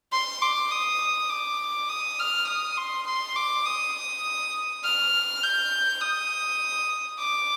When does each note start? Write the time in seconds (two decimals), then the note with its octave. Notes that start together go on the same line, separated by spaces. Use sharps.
0.12 C6
0.42 D6
0.71 D#6
1.30 D6
1.89 D#6
2.19 F6
2.48 D#6
2.77 C6
3.07 C6
3.36 D6
3.66 D#6
4.84 F6
5.43 G6
6.01 D#6
7.19 D6